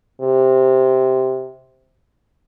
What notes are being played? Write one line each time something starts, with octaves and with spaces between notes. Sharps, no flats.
C3